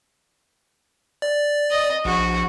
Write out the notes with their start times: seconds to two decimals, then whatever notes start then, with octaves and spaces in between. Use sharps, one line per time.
1.22 D5
1.71 D#5
2.05 A#1 F#4